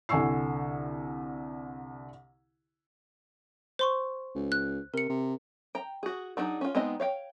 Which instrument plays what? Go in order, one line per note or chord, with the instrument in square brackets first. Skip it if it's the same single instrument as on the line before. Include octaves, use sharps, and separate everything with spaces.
[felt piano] C2 D3 G#5 C#6 E6 C7
[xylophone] C5 C6 C#6
[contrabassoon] C#2
[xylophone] F#6
[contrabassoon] C3 [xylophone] A#4 C#7
[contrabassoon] C3
[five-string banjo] G5 A#5
F#4 G#4
F#3 D4 D#4 G#4
C#4 F4
G#3 B3 C4 D#4 D#5
C#5 F5 G5